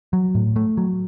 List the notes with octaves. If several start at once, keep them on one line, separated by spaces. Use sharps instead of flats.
F#3
A2
A3
F#3